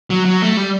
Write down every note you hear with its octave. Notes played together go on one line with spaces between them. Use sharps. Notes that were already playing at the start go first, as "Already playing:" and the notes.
F#3
F#3
A3
G3